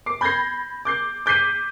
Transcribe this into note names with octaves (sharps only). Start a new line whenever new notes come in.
D6 C7
B5 G6 G#6 A#6 C7
D6 G6 C7
D6 G6 B6 C7 D#7